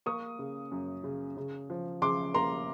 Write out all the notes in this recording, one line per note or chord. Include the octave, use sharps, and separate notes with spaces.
A#3 C#6 D#6
C#3
F#2
C#3
C#3
F3
C#3 C6 D6
A#3 A#5 C6